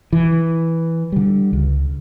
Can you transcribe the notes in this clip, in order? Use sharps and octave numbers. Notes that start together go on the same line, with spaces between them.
E3
D3 G3
C#2